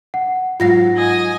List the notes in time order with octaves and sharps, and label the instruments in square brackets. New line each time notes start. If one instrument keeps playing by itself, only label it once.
[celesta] F#5
[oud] G#2 F#3 F5 [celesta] F4 A#6
[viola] D#5 G#5